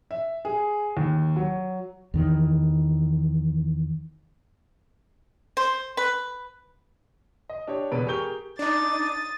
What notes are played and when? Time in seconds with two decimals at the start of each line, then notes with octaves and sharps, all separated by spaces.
0.11 E5
0.45 G#4
0.97 D#2
1.36 F#3
2.14 E2 D#3 E3
5.57 C5
5.97 B4
7.50 D#5
7.67 D4 G4 C#5
7.92 E1 E2 B2 B4 D5 D7
8.07 G4 G#4 A#4 C#6 G6 G7
8.59 D4 D#4 D6 D#6 A6